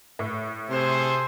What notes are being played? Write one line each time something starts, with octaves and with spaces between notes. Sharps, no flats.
A2
C3 G#4 A4 C5